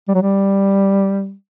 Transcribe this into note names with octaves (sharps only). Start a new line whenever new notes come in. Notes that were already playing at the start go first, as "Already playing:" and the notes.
G3
F#3
G3